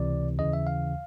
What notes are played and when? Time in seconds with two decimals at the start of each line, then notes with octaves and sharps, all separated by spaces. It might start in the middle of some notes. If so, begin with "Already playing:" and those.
Already playing: C#2 C3 E3 D5
0.39 D#2 C#3 E3 D#5
0.53 E5
0.67 F5